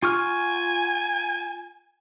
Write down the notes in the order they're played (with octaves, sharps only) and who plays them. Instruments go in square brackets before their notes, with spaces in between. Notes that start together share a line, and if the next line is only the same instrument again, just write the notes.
[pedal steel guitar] F4 C#6 F6 [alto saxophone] G#5